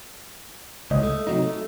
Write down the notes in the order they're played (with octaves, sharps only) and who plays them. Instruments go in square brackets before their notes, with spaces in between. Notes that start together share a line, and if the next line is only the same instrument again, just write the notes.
[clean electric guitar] C#2 [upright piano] D#5 D#6
[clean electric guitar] A3
C3 F#3 D#4
A3